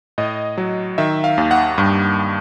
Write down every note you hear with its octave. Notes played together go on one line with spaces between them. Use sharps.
A2 D#5
F#3
D#3 E5
F5
D#2
F#5
G2